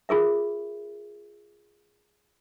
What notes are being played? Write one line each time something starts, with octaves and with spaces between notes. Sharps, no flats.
F4 G#4 A#4 E5